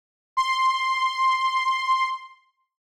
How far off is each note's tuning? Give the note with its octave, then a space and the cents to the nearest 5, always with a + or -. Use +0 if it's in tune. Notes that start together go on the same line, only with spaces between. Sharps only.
C6 +5